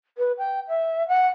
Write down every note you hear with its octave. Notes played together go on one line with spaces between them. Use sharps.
B4
G5
E5
F#5